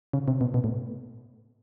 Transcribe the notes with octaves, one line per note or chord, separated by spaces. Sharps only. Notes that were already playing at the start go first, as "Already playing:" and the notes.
C#3
C3
B2
B2
A2